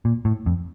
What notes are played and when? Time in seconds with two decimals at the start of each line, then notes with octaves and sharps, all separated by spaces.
0.05 A#2
0.25 A2
0.46 F2